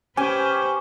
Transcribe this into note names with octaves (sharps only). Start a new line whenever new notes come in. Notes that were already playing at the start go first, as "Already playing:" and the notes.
C#4 G4 B4 C5 G#5